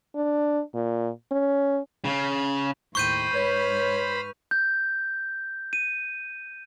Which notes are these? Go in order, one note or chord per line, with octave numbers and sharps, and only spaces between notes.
D4
A#2
C#4
C#3
D#2 A2 C5 G5 B5 C#6 G6 D#7
G#2 B4 C#5 F6
G6
D#7